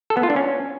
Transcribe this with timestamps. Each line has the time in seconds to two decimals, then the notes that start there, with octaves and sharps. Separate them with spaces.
0.10 A4
0.17 B3
0.23 F4
0.30 D4
0.36 C#4